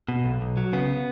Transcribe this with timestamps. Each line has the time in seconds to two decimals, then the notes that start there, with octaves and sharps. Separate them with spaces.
0.09 B2
0.25 B1
0.41 B1
0.57 F#3
0.73 C#3 B3